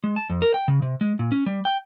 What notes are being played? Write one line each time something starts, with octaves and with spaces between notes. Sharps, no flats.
G#3
A5
F2
A#4
G5
C#3
C3
G#3
A#2
C#4
G3
G5